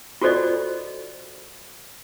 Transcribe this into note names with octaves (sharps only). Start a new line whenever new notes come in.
F4 F#4 A4 C5 D5 D#5